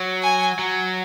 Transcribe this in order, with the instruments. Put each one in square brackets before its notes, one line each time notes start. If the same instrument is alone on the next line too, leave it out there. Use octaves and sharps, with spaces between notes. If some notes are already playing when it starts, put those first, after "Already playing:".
Already playing: [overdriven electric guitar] F#3
[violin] G#5
[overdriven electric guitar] F#3